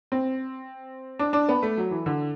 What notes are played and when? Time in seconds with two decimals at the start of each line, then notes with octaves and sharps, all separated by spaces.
0.12 C4
1.19 D4
1.33 D4
1.49 B3
1.63 A3
1.77 F#3
1.91 E3
2.06 D3